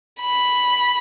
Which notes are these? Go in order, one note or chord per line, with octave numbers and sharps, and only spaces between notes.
B5